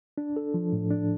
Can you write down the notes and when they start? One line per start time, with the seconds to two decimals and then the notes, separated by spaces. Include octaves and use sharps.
0.18 D4
0.36 A4
0.54 F3
0.73 A2
0.90 D4